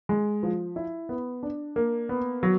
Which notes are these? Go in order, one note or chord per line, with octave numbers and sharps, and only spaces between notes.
G#3
F3
E4
B3
D4
A#3
B3
F#3